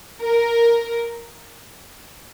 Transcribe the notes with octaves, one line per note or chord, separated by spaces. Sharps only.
A#4